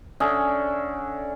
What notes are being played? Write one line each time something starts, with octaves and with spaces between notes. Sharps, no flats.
D3 C#4 G#4 E5